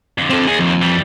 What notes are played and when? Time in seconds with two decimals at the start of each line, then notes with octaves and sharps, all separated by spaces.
0.18 F2 D3
0.30 C4 A4
0.47 D#2 G#4
0.59 F2
0.82 E3 G3